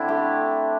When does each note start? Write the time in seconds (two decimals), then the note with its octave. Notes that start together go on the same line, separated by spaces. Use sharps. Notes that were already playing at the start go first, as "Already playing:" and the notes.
Already playing: D3 C4 D4 E4
0.08 A3 G4